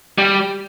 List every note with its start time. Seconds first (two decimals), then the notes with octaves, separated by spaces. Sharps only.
0.18 G3